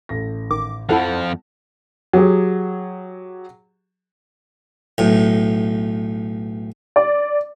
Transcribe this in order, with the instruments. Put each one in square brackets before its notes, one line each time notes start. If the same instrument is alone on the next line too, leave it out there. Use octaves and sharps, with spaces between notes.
[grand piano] A1 A4 A#6
[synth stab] G#1 D#3 D6
[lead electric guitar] F2 F3 [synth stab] E4 A4 F#5 [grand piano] A5 B5
[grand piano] F#3 G4 G#4
[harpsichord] B1 A2
[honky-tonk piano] D5